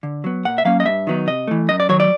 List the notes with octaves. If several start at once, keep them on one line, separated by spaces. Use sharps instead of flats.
D3
F#3 B3
A#2 F#5
E5
F#3 A#3 C#4 F5
D#5
G2 E5
D#3 F#3 B3 D#4
C3 D#5
E3 A3
F#2 D#5
D5
D#3 F#3 C#5
D5